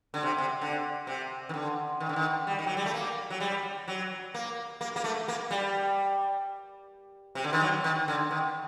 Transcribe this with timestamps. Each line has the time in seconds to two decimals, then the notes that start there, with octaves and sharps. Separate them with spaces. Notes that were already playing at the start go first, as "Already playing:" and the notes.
0.14 D3
0.23 C3
0.38 C3
0.61 D3
1.07 C3
1.49 D#3
1.54 D3
2.00 D#3
2.09 D3
2.16 D#3
2.47 G3
2.59 D#3
2.67 F#3
2.77 G3
2.86 A3
2.94 A#3
3.30 F#3
3.40 G3
3.88 F#3
4.34 A#3
4.81 A#3
4.96 A#3
5.04 A3
5.28 A#3
5.51 G3
7.35 C3
7.44 D3
7.53 D#3
7.61 F#3
7.84 D#3
8.08 D3
8.31 D#3